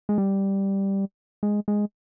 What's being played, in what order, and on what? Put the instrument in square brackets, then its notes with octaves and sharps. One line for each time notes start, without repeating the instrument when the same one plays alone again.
[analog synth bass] G#3
G3
G#3
G#3